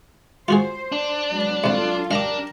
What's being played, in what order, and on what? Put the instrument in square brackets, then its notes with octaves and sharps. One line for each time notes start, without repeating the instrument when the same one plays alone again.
[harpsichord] F4 F#4 G#4 [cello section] C5
[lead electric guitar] D4
[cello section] F#3 G#3 B3
[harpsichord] C2 G3 [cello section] F#3 F4 A4
[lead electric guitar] D4 [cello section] G4 A#4 [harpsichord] F5 A#5 D6